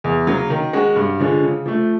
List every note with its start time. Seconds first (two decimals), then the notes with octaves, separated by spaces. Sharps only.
0.04 E2
0.27 C#3 F#3 A#3
0.50 D#3
0.73 G#3 C#4 F#4
0.96 G2
1.20 D3 F3 G#3 C#4
1.42 C#3
1.66 F3 A3